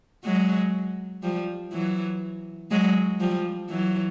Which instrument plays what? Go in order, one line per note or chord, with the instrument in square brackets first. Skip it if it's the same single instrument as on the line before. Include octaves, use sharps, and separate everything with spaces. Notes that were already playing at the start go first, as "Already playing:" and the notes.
[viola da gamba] F#3 G#3
F3 G3
E3 F#3
F#3 G#3
F3 G3
E3 F#3